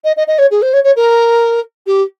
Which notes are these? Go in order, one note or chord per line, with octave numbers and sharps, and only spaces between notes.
D#5
D#5
D#5
C#5
G#4
C5
C#5
C#5
A#4
G4